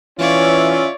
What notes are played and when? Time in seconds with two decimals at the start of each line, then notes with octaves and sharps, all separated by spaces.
0.19 E3 C#4 F4 C#5 D5 E5